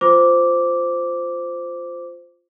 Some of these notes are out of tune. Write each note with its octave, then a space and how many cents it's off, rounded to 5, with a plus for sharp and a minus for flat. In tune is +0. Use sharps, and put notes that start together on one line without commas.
F4 +5 C5 -10 D6 -10